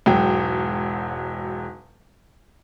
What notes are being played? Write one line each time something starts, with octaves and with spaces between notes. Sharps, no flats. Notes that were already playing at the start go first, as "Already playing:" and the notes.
E1 G#2 F#3 G5